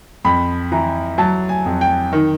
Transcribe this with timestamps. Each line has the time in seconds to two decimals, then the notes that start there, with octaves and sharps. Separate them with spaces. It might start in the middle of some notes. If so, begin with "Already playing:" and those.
0.24 F2 B5
0.72 E3 A#5
1.18 F#3 A5
1.49 G#5
1.66 F2
1.81 G5
2.13 D#3